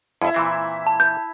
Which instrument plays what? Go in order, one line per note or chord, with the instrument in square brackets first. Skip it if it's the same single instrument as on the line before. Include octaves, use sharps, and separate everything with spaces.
[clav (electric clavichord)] F2 [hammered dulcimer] E4 E5
[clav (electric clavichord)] A#2 E3 C4
[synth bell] A5
[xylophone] G6